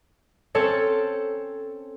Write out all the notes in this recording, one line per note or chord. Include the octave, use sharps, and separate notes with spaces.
C4 C#4 A4 C#5